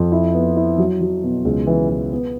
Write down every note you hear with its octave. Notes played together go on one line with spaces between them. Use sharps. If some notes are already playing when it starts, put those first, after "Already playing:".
Already playing: F2
E4
B3
E4
F#3
F#3
B2
C#2
E3
E3
B3